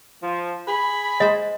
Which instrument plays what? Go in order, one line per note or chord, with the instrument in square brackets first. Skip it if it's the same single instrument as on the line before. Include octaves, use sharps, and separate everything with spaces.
[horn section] F3
[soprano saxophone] G#4 [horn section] B5
[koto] G#3 C5 [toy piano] D#5